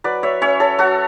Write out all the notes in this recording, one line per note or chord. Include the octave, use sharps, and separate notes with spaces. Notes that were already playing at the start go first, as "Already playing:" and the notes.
F#3 B4 D5
C#5 E5
C#4 C#5 E5
A4 C#5
F#3 F#4 A4